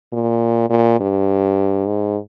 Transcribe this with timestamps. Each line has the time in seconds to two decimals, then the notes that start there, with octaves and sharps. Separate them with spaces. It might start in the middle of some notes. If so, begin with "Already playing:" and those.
0.13 A#2
0.70 A#2
1.00 G2
1.87 G#2